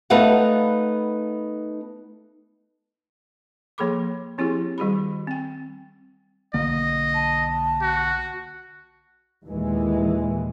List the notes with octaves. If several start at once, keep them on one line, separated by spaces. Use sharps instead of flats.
A3 B3 D#4 F5 F#5
F3 A#3 G#4 A4 B5 D6
F3 C4 E4 G4 G#4 C6
D#3 G3 F#4 G#4 B5
C4 G5
B1 D3 A#3 D#5
A5
F#4
D#2 A#2 E3 G#3